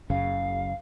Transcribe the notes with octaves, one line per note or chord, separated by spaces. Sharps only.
F#1 F#2 C#3 F5